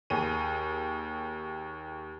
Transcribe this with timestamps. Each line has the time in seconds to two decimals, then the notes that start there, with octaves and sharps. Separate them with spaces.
0.10 D#2 G#4 D#7